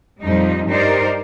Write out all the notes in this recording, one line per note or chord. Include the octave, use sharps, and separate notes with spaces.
F2 A#2 F3 G3 D#4
G2 D#4 G4 A#4 C5 D5